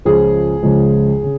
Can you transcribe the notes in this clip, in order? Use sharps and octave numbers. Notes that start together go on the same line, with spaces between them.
C#2 C#3 F3 G#3 G#4
C#2 C#3 F3 G#3
C#3